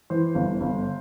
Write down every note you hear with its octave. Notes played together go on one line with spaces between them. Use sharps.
E3 C5
G1
G1